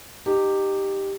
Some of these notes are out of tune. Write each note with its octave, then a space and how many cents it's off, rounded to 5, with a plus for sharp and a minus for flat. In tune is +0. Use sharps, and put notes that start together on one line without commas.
D#4 -25 G4 +0